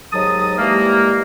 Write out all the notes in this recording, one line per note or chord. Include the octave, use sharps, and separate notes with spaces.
D#2 G#2 F#3 D#5 A5 D#6
E3 G3 G#3 A#3